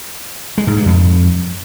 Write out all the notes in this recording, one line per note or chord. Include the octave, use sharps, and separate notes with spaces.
G#3
G#2
G2
F2